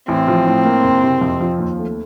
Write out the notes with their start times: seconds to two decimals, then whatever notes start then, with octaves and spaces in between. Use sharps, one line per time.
0.08 A1 C4
0.28 F3
0.46 A2
0.65 A#3
0.84 F#1
1.03 C3
1.21 F2
1.41 F3
1.59 D#2
1.78 A3